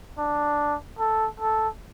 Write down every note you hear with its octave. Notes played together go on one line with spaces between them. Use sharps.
D4
A4
A4